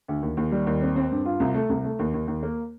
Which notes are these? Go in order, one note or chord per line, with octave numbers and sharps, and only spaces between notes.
D2
D#2
D#2
G3
D#2
C4
C4
G2
F4
C2
A3
C2
A3
D#2
D#2
D#2
A#3